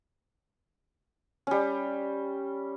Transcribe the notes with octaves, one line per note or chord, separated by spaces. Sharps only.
G3 C#4